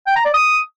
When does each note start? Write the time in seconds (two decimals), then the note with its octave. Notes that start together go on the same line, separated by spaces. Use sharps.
0.07 G5
0.16 A#5
0.25 D5
0.34 D#6